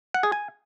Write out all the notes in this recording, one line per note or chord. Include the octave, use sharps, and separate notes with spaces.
F#5
G#4
G#5